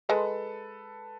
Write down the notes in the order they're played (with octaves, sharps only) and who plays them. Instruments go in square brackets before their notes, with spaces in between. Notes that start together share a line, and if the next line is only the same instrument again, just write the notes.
[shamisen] G#3 [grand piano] A4 B4